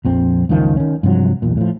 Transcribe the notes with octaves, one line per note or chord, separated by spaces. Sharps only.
A#1 F2 C4
C#2 F#2 D#3 F3
D#3 C#4
G2 C3 F3 F#3
B1 E2 A#2
A2 F3